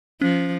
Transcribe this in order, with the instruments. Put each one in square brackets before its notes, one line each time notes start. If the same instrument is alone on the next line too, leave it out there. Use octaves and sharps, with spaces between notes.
[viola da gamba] F3 [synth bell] C#4